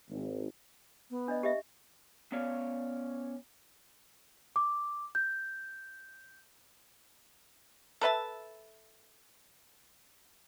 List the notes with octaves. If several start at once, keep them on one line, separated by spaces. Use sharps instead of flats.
G#1
B3
D4 D5 D#5
G4 D#5 E5
B3 C#4 C#5 D5 F5
D6
G6
A4 B4 E5 A5